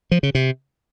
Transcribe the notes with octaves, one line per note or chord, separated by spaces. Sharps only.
F3
C#3
C3